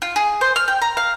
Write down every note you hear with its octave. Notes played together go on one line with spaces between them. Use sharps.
F4
G#4
C5
F6
G5
A#5
F5